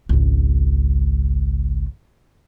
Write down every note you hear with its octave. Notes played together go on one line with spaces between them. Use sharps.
G#1 C#2